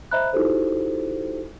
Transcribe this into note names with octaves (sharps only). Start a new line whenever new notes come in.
C5 D#5 E5 A#5 B5 F#6
D#4 E4 F#4 G4 A4 C5